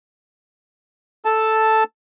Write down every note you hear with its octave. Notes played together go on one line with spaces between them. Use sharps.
A4 A5